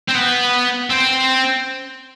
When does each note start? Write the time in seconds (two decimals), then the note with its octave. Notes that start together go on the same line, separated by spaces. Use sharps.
0.09 C4
0.15 B3
0.90 C4